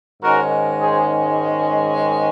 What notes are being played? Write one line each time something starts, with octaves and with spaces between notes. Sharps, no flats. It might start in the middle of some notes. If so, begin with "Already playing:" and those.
G#2 D#3 G#3 C#4 F#4 A#4
G#4 C5